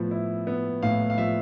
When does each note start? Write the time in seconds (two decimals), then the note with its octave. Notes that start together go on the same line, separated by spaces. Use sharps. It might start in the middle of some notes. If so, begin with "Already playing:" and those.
Already playing: A2 F3 B3
0.11 E4
0.47 B3
0.83 A2 F5
1.10 F5
1.18 F3 E5